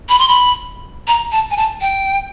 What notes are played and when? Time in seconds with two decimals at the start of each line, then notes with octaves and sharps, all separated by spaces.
0.09 B5
0.19 C6
0.28 B5
1.08 A#5
1.32 A5
1.51 G#5
1.57 A5
1.81 G5